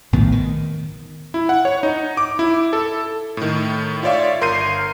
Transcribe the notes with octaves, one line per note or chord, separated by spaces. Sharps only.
A#1 A2 D#3 B3
D#3
E4
F#5
C#5
D#4
D6
E4
A4
A2 D#3
F4 C#5 D5 E5 F5
G1 A#4 C6 G6 C7 D#7